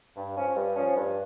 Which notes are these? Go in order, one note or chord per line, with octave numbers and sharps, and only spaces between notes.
G2
F3 C#4
G2
F3 C#4
G2